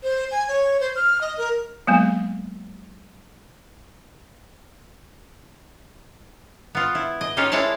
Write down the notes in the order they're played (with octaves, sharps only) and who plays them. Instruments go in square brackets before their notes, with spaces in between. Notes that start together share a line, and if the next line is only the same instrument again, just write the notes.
[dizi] C5
G#5
C#5
C5
F6
D#5
A#4
[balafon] F#3 G#3 A#3 B3
[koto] B3 F4
E4
D#5
A#3 C#4 D#4 F4 G4
G#3 E4 C#5 D5 A5